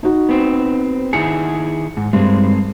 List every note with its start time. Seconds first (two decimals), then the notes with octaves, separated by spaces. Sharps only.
0.03 D#4 F#4
0.29 B3 C4
1.13 D#3 E4 G#4 C#7
1.97 G#2
2.13 G2 G#3 C4